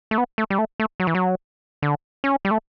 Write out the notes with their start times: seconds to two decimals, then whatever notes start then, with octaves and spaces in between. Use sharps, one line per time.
0.11 A3
0.18 B3
0.38 A3
0.50 G3
0.59 A3
0.80 A3
1.00 F#3
1.07 E3
1.15 F#3
1.82 D3
2.24 C#4
2.45 G3
2.51 A3